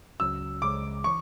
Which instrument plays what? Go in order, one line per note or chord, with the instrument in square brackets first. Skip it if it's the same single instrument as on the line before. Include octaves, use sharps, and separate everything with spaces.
[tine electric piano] C#2 C#3 F#3 C#4 F#4 [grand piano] E6
[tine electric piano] C#2 C#3 G#3 [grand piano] D6
[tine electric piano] E3 [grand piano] C#6